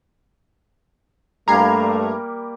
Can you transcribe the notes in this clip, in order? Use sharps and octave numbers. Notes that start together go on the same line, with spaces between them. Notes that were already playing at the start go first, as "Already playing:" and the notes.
G2 G3 A3 A#3 A#5 G#6 C7